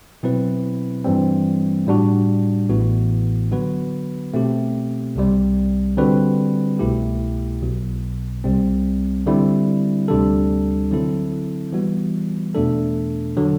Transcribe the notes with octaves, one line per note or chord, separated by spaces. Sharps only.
B2 F#3 C4 E4 B4
G2 E3 G3 C4
A2 G3 D4 F#4
A1 A2 E3 B3 F#4
D3 F#3 B3 F#4 B4
B2 A3 C4 G4
C2 C3 G3
D3 G3 C4 F#4 B4
C2 B2 A3 E4 G4
B1 B2 F#3
C2 C3 G3 C4
D3 G3 C4 E4
D2 C3 G3 D4 A4
D3 F#3 C4 E4 A4
E3 G3 B3 F#4
E2 B2 A3 D4 A4
D3 F#3